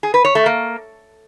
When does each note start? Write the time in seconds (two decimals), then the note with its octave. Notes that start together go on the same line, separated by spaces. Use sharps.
0.03 G#4
0.14 B4
0.25 C#5
0.35 A3
0.46 A#3